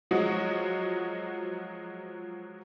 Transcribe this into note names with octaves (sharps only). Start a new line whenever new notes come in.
F3 F#3 G#3 F#4 D#5